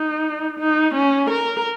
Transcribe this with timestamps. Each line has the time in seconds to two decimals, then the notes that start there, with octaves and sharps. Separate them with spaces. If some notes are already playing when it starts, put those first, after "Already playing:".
Already playing: D#4
0.59 D#4
0.95 C#4
1.30 A#4